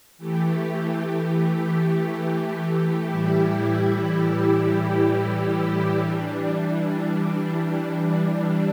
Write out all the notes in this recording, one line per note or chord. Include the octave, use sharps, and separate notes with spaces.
E3 A3 G4
A2 E3 G3 E4 G4
E3 G3 D4